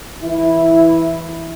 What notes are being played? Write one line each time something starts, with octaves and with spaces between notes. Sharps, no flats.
E3 E4